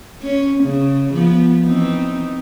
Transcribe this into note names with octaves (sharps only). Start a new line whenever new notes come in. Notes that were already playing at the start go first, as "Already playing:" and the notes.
C#4
C#3
F3 B3
E3 C4 D#4